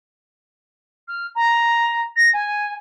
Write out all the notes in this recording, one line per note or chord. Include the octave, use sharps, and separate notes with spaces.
F6
A#5
A#6
G#5